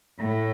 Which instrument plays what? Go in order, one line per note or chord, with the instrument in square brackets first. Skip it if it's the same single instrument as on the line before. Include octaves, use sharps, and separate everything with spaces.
[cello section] A2